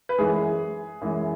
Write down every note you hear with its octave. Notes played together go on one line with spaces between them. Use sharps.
B4
F#2 E3 G#3 G#4
F#2 E3 G#3